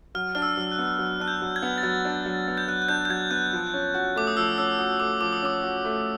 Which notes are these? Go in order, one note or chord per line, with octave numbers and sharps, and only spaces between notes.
F#3 F6
D4 F6
E6
F#3
F#6
B3
F#3
D4 F#6
G6
F#3
G#6
B3
A6
F#3 G#6
D4
F#3
B3
G6
F#3 F#6
F#6
D4 G6
G6
F#3 G#6
B3 F#6
F3
C#4
F#4
A3 D6
D#6
F3 E6
C#4 E6
F#4 D#6
A3 D6
F3 D6
D#6
C#4 D6
F#4
A3